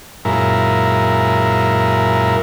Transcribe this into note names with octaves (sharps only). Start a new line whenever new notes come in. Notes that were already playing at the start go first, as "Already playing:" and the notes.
F#2 A#2 G#3 E4 A#4